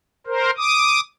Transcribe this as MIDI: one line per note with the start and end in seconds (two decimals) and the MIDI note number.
0.27 0.51 70
0.27 0.51 72
0.57 1.00 86
0.57 1.00 87